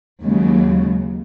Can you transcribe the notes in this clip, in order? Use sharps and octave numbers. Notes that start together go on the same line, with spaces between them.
D#2 C#3 F#3 G#3